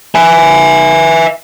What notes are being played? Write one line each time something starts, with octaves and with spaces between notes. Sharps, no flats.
E5 G#5